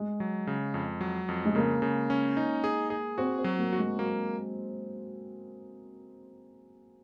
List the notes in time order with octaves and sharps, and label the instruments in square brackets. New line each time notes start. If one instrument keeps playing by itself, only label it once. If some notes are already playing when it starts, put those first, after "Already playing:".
Already playing: [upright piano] G#3
[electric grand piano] F#3
C#3
F2
F#3
F2
[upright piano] G#3
[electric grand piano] C#3 [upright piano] A#3
[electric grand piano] C#3
C#4
D#4
G#4
G#4
[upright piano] C4 [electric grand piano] F#4
[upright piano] C4
[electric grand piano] F#3
[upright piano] A#3
[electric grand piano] F#4
[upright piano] G#3
[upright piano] F#3 [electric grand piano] A#3